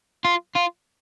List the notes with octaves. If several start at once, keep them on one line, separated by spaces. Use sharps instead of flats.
F4
F4